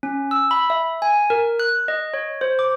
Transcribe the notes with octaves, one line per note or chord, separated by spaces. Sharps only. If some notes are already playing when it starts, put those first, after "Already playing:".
C#4
E6
B5
E5
G#5
A#4
F#6
D#5
C#5
C5
D6